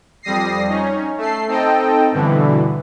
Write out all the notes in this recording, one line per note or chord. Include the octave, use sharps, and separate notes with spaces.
F2 G3 D#6 A#6 C7
C#4 D#4
A3 A4 C7
C4 D#4 A4 D#5 G5
G2 B2 D3 E3